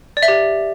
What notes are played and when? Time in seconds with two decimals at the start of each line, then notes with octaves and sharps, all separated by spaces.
0.17 D5
0.23 E5
0.28 G4